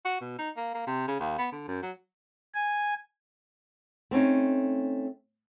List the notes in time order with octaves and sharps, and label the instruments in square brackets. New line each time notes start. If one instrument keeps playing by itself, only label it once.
[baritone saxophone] F#4
B2
D#4
A#3
A#3
C3
C#3
D#2
B3
D3
F#2
F#3
[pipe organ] G#5
[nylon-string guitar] A3 C4 C#4 D#4